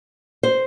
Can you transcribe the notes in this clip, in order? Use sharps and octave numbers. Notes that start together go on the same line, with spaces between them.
C5